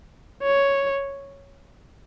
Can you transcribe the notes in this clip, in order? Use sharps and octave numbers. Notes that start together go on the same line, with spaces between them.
C#5